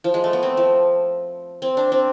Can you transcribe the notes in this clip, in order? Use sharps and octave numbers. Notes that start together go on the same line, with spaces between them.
F3
G#3
A3
B3
C4
F3
C4
D4
C4